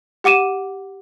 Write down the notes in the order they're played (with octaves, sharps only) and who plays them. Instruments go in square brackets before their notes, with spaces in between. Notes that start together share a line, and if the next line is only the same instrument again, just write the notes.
[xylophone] G4 F#5 D6 D#7 E7